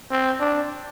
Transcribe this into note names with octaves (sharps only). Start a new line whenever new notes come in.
C4
D4